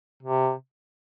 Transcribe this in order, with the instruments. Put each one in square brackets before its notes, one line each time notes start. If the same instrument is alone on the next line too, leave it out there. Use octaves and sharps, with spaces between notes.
[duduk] C3